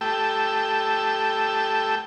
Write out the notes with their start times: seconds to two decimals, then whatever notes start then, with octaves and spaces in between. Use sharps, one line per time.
0.01 A3 G4 A4 G5 E6